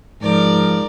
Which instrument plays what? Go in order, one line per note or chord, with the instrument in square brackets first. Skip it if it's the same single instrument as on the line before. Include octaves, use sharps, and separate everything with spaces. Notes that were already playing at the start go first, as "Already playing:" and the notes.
[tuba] G#2 [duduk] F3 [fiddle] A#4 D5